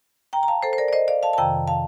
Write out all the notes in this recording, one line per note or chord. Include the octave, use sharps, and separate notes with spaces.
G5 A#5
A#5
F5 A5
A4 C5
C5
A#4 D5
D5
C5 D#5
D5 F5
F5 A5
A5
F2 C3 D#3 G5 A#5
F5 A5